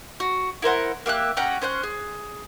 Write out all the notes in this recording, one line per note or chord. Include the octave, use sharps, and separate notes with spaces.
F#4
E4 A#4 C5 F#5
A#3 G4 E5 F#6
C#4 G4 F#5 A#5
C#4 C5 C6 F#6
G#4